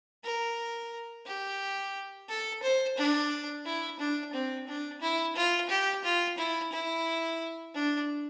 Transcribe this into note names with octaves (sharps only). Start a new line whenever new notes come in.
A#4
G4
A4
C5
D4
E4
D4
C4
D4
E4
F4
G4
F4
E4
E4
D4